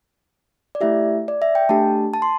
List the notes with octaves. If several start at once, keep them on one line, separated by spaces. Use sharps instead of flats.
D5
A3 E4 G4 E5
D5
E5
G5
A3 D4 G4 A5
A5
C6